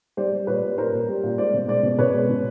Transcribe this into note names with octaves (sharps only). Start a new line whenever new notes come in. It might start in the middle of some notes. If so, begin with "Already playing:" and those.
G3 C5 D5
G3
A#2 B4 C#5
G3
A#2 A#4 C5
A#2
G3
A#2
G#3 C5 D5
B2
G#3 C5 D5
B2
B2 B4 C#5
G#3
B2